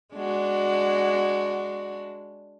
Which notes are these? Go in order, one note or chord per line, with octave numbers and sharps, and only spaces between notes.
G#3 D4 F#4